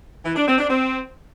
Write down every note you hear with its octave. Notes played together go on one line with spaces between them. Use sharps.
E3
D4
C4
D4
C4